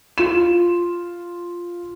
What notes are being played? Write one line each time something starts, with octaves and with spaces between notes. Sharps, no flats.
F4 E7